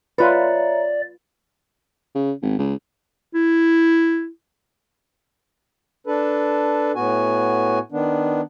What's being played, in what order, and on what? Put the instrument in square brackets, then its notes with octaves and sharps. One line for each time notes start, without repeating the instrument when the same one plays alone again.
[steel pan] F4 B4 [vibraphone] C#5 E5 A#5 [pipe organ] D5
[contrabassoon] C#3
G#1
C#2
[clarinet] E4
[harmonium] D4 A4 B4
A2 B3 F#4 G#5
D#3 B3 D4